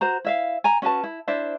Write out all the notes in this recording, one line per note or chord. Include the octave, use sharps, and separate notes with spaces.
F#4 C5 A#5
E4 E5 F5
G#5 A#5
C#4 F#4 B4 A5
E4
D4 E4 C5 E5